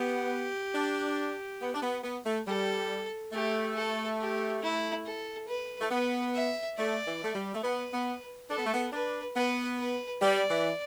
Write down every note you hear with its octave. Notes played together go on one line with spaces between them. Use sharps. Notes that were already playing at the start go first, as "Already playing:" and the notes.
Already playing: B3 G4
D4
B3
D4
B3
B3
A3
G3 A4
A3 G4
A4
G4
E4
A4
B4
A3
B3 B4
E5
A3 D5
E3
A3
G3
A3
B3 B4
B3
D4 A4
B3
A3
B3
D4 B4
B3 B4
B4
G3 D5
E3